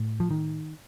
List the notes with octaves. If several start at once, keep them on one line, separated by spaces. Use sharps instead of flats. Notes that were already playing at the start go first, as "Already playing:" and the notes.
Already playing: A2
F3
D#3